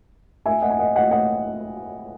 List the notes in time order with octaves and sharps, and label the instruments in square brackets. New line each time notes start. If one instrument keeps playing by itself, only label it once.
[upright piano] E5 G#5
D#5 F#5
G#5
D#5 F#5
D#5 F#5
D#5 F#5